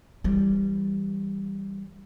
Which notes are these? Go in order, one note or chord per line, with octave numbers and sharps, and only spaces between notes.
E3 G3